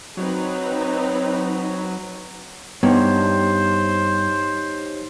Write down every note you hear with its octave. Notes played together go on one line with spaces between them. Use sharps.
F#3 C4 D#4 B4
G2 B3 D#4 G4 C5 C#5